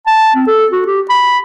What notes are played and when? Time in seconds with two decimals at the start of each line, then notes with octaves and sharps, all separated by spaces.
0.07 A5
0.35 C4
0.47 A4
0.72 F#4
0.86 G4
1.10 B5